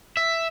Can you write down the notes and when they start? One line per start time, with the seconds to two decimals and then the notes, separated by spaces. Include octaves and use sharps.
0.17 E5